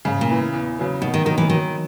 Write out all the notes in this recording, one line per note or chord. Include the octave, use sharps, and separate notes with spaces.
G#2 C#3
A#2
E3 B3
E2
C#3 F#3 B3
B2 D#3
D#3
D#3 F#3 A#3 D#4 A#4
E3
D#3 F#3